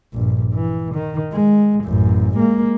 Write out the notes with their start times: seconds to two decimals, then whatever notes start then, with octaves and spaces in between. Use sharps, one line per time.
0.13 A#1 G2
0.53 E3
0.94 D#3
1.33 G#3
1.84 A1 F#2
2.35 G#3 A#3